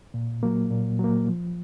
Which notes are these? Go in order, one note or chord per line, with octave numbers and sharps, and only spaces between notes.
A#2
F#3 A#3
A#2
F#3 A#3
F3